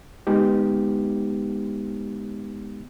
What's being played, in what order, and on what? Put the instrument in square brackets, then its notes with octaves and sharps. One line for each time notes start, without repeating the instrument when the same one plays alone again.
[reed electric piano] G#3 B3 D#4 G4